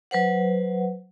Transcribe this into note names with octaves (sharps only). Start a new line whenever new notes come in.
F#3 B4 C5 F#5